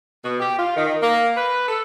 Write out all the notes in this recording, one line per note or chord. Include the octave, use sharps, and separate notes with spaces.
B2
G4
F4
D#3
A#3
B4
A4